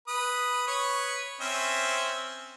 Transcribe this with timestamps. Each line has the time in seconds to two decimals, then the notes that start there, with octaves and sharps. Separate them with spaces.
0.08 B4 D#6
0.67 B4 C#5
1.41 C4 C#4 E5